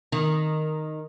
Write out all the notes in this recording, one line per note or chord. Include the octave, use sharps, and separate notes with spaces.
D#3